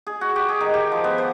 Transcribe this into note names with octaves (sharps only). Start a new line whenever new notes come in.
G#4
F#4
G4
G#4
D#3
G4
F3
B3
C5